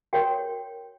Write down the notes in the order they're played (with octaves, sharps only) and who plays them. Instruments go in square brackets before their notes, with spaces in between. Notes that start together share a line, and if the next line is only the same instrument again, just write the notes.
[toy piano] F#4 A#4 C#5 G5